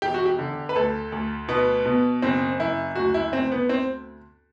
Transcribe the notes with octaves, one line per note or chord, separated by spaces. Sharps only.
E1 G4
F#4
G4
D3
B4
D2 A4
D2
B2 B3
B2
F#1 C4
F#1 E4
D2 F#4
E4
D2 C4
B3
C4